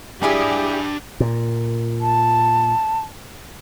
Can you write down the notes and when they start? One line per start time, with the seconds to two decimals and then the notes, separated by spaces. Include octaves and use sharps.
0.23 G3 D4 E4 G4 G#4 G#5 B5
1.20 A#2
2.01 A5